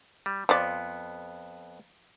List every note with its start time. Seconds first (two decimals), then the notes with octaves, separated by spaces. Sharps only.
0.26 G3
0.49 F2 F3 B3 D5